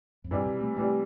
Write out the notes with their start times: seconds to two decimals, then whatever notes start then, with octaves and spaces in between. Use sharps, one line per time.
0.24 F2
0.31 G2 C3 E3 G3
0.46 B2
0.61 A3
0.77 C3 E3 G3 A3